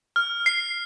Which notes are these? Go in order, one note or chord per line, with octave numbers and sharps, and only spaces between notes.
F6
C7